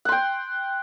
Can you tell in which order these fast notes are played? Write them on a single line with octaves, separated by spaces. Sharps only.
F#5 C6 G5